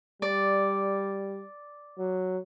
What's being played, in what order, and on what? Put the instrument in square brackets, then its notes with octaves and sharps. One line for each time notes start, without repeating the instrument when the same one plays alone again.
[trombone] G3 [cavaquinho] D5
[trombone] F#3